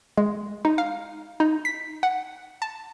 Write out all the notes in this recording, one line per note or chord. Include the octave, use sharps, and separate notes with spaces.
G#3
D#4
F5
D#4
B6
F#5
A5